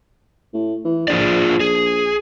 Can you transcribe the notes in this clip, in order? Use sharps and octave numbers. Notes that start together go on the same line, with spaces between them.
A2
E3
A#1 F4 G#4 D5
G#4